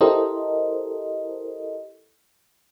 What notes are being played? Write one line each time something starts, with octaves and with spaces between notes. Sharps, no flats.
E4 G4 A4 A#4 C5 D#5